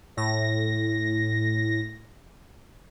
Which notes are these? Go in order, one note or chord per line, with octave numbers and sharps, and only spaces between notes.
A2 A#6